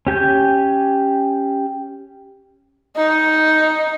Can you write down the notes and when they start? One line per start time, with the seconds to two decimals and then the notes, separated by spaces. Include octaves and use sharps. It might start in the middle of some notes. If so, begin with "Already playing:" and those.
0.07 C#4 G4 G#5 G6
2.97 D#4